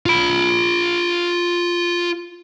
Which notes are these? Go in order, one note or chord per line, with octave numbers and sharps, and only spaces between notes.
F4 B5